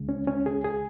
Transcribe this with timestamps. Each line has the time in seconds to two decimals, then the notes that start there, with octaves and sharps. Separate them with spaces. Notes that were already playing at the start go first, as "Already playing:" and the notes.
Already playing: C#2 C#3 G#3
0.09 C#4
0.27 C#4
0.46 G#4
0.64 G#4